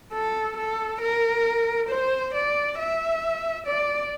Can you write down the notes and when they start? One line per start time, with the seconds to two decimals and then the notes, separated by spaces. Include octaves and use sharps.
0.13 A4
0.57 A4
1.01 A#4
1.89 C5
2.34 D5
2.78 E5
3.66 D5